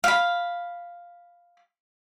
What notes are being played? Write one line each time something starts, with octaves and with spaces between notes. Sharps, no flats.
F5 B5